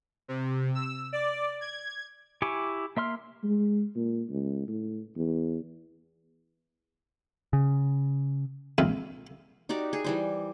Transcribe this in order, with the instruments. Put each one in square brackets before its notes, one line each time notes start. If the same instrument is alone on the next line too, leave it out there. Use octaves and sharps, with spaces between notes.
[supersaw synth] C3
E6
D5
G#6
[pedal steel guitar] E4 G4 G#5 C#6 D6
A#3 E5 C6 F6
[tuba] G#3
A#2
C#2
A2
E2
[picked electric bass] C#3
[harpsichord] A#1 G#2 C3 E5 F5
[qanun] D#4 F#4 G4 D5
G#4
E3 G3 C5